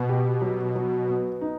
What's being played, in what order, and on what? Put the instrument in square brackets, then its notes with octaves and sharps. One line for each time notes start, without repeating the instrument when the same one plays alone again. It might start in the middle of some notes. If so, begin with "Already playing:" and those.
Already playing: [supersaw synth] B2
[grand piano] G4
F#3
F#3
B3
D#4